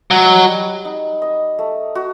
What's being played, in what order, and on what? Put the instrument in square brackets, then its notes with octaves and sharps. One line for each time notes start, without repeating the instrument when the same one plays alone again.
[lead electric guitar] F#3 [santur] D#5
[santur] G3
D#4
D#5
A3
F#4